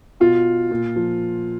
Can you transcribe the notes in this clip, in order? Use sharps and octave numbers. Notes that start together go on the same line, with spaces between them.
B2 F4
A#2
F3